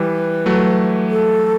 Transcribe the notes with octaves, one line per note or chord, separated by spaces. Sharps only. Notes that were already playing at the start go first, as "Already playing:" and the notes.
Already playing: E3 G3 B4
F#3 A3
A4